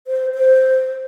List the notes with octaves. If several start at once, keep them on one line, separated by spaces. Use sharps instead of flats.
C5
C5